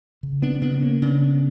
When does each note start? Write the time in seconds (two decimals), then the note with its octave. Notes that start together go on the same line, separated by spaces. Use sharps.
0.23 C#3
0.42 B3 D4
0.61 C#3 B3 D4
0.83 A#3 C#4
1.02 C#3 B3 D4